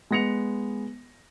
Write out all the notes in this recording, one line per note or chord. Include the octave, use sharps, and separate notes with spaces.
G#3 B3 A#6 C#7 F7